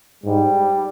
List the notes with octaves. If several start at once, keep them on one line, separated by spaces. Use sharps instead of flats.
G#2 G3